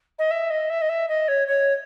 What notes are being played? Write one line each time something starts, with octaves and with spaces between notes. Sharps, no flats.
D#5
E5
D#5
E5
D#5
E5
D#5
C#5
C#5